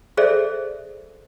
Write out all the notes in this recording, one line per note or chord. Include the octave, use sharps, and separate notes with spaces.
G#4 A4 C5 D5 E5